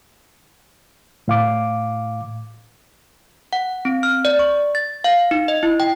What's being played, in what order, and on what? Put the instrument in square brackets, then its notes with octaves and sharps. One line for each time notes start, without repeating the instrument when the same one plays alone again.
[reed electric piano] A2 F5 D6
[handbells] F#5
C4
F6
D5
C#6
A6
F5
D#4
D#5
E4
G5